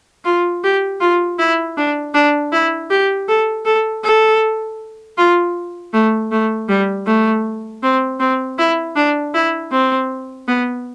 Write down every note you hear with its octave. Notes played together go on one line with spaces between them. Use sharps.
F4
G4
F4
E4
D4
D4
E4
G4
A4
A4
A4
F4
A3
A3
G3
A3
C4
C4
E4
D4
E4
C4
B3